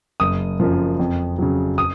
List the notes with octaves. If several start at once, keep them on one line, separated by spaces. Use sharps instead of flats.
F#1 D#6
F#2 F3
F2
C#3 F#3
D#6